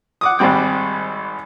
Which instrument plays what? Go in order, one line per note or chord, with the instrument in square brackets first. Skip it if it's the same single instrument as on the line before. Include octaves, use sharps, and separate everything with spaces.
[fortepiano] F#5 D6 D#6
G#1 G#2 G3 C4 G5